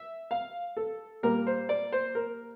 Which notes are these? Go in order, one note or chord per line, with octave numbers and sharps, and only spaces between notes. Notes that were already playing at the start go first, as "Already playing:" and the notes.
Already playing: E5
F5
A4
A#2 G3 A#3 A#4
C5
D5
C5
A#4